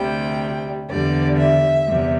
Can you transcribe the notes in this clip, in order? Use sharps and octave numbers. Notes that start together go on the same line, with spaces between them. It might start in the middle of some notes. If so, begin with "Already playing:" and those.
Already playing: D2 C3 G3 G5
E2 D3 G3 D5
E5
E2 C3 G3